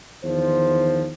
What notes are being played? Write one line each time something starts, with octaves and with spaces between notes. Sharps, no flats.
E2 D#3 F3 C5